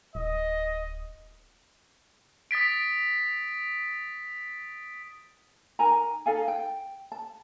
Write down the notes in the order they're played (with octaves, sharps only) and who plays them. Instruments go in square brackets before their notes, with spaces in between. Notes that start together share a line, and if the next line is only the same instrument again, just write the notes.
[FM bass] D1 [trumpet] D#5
[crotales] D#6 A6 B6 D7
[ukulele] D#4 A#4 G#5 A#5
D#4 A4 F5 G#5
G5
A5